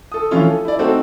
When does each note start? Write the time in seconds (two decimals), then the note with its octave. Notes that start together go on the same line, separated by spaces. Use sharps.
0.12 A4 D#6
0.31 E3 F3 A3 C#4 E4 F4
0.45 A4
0.65 E4 D5
0.79 A3 C4 D#4 F#4 A4